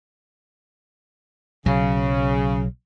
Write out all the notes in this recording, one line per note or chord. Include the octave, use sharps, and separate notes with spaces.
B1 C#3 F#3